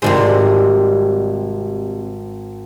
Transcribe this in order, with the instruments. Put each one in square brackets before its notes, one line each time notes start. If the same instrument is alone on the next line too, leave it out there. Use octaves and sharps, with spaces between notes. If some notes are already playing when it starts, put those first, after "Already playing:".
[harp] G#1 C5 [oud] C3 G3 G#4